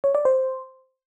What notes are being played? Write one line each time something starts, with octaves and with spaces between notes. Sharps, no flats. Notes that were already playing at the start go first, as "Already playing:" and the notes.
C#5
D5
C5